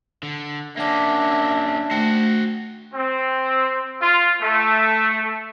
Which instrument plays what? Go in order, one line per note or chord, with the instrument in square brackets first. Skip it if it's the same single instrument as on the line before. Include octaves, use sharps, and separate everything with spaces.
[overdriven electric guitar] D3
[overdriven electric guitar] A#3 C#4 [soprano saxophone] D4 [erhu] E5 [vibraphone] F#5 D6
[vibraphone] A3 G5 [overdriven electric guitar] F#4 C5
[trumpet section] C4
F4
A3